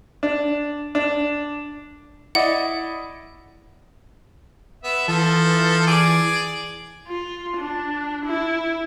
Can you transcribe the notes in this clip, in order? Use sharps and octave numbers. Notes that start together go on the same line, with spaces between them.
D4
D4
E4 D5 D#5 F#5
B3 E5
E3 F3 A4
G#4 D5
F4
D4
E4